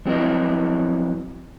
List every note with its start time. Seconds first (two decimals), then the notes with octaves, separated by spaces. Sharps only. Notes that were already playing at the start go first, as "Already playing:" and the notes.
0.05 F3 F#3 C4 E4 B4 D#5